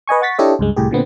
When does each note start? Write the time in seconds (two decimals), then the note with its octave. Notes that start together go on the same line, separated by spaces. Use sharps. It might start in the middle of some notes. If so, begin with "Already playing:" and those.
0.07 B4 D#5 G#5 C#6
0.21 F#5 C#6 A6 B6
0.38 D4 E4 G4 A4 C#5 D#5
0.59 C#2 G2 G#3
0.76 C2 A2 G4 G#4
0.91 A#2 D3 B3 C4